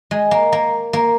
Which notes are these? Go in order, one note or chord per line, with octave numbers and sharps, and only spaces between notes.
G#3
A#3
A#3
A#3